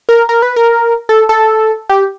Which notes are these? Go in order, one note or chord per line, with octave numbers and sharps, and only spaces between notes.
A#4
A#4
B4
A#4
A4
A4
G4